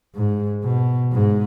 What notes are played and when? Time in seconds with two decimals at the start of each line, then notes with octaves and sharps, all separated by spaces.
0.16 G#2
0.64 B2
1.12 G#2